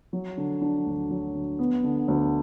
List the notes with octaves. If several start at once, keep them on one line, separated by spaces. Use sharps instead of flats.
F#3
D3
D4
D2
F#3
D3
B3
D3
D2